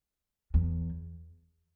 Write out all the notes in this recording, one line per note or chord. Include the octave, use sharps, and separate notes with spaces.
E2